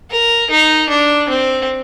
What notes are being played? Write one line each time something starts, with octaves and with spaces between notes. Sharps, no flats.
A#4
D#4
D4
C4